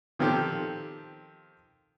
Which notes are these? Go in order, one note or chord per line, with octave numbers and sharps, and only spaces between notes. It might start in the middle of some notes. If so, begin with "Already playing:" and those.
D#3 F3 C4 G4 A4